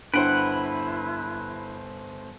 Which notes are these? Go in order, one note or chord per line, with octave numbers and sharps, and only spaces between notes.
G1 D4 E4 B4 C5 F#5 D7